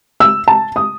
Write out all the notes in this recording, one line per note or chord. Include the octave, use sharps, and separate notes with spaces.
E6
A5
D#6